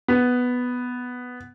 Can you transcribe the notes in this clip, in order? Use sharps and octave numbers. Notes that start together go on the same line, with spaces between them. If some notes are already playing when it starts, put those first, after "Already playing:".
B3